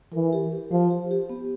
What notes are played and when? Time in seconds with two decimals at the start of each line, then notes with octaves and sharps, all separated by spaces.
0.13 E3 A#4
0.33 G4
0.52 G4
0.71 F3 C5
0.91 G4
1.11 G4
1.30 B3